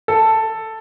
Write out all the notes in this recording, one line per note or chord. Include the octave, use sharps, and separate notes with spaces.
A4